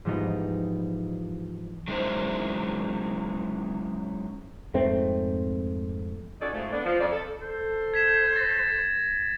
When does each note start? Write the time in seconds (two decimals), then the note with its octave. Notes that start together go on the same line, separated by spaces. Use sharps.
0.05 G#2 E3 F3 G3 B3 D#4
1.88 F#3 G#3 C#4 D#4 E4 C5
4.74 F2 G#2 A3 C4
6.41 C#4 D#4 F#4 A4 D5
6.53 G#2 F3 A3
6.72 B3 D4
6.85 F3
7.00 F2 D5
7.12 A4
7.41 A4 C5
7.94 G#6 B6 E7
8.36 A6 A#6